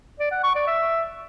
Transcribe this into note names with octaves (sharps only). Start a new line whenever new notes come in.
D5
F#5
C#6
D5
E5